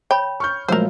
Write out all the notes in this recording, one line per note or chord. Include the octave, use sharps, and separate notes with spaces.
C#5 G5 B5
C#6 F6 G6
A#2 F3 F#3 G#3 A3 A#4 C5